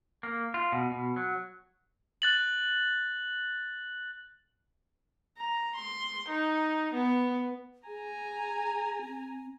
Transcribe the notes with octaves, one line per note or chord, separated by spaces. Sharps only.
A#3
F4
B2
B2
F#3
F#6 A6 F#7
A#5
C6
D#4
B3
G#4 G#5 A#5
C4